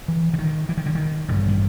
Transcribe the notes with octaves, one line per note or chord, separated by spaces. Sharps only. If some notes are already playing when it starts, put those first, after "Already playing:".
E3
D3
D#3
E3
D#3
D3
D#3
A1 G2 D3 D#3
D#3